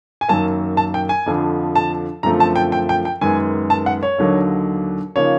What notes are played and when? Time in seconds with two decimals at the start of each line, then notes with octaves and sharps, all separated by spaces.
0.21 G#5
0.28 F#2 D#3 F#3 A#3 A5
0.77 A5
0.94 G5
1.09 G#5
1.26 F2 D3 F3
1.75 A5
2.23 F#2 D3 F3 A3 C4 A#5
2.40 A5
2.56 G5
2.72 G5
2.89 G5
3.05 G5
3.21 F#2 D#3 G#3 B3 G#5
3.70 A5
3.86 F#5
4.03 C#5
4.18 D#2 D3 F#3 A#3 D#4
5.16 C#3 F3 A#3 D#4 C#5